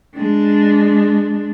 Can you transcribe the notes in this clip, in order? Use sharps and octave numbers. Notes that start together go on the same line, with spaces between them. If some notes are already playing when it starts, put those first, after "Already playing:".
G#3 D4